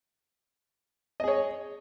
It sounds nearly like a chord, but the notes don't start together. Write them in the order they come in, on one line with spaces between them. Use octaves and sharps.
D#5 G#4 C#5